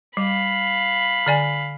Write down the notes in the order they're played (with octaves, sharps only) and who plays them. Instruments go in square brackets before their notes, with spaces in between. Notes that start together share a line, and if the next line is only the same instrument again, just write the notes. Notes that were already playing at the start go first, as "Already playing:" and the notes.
[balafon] G3 [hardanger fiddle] F5 B5
[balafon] D3 D5 G#5